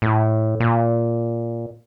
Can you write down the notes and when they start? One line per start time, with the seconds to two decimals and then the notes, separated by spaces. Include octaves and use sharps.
0.02 A2
0.60 A#2